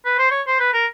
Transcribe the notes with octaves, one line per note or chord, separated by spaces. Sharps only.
B4
C5
C#5
C5
B4
A#4